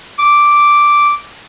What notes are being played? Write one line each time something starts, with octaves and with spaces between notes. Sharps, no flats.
D6